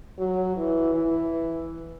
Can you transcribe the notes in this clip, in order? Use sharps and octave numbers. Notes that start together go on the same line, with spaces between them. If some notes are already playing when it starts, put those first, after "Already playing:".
F#3
E3
E3